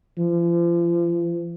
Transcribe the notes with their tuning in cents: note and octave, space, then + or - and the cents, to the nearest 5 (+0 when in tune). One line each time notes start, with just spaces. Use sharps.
F3 -35